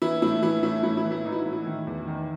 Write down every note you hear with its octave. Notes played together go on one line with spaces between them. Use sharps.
E3 E4
A2 E4
E3 E4
A2 E4
A2 E4
E4
E3
E4
E3 D#4
E4
F#4
A2
E4
D#3
E2
D#3